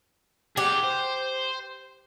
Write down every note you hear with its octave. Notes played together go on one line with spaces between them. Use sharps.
G4 G#4 F#5
C5